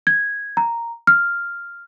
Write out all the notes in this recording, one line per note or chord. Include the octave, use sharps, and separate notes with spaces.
G#6
A#5
F6